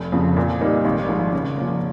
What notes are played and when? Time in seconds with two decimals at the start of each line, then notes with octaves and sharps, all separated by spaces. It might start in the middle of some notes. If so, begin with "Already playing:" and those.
Already playing: F1
0.12 F2 C#3 F3
0.37 A#2
0.61 G3 A#3 D#4
0.85 G#1
1.09 G#2 F3
1.33 C#3
1.57 F3 A#3